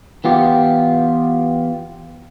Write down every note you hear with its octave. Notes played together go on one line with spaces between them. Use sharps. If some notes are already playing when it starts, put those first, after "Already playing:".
E3 B3 F4 G4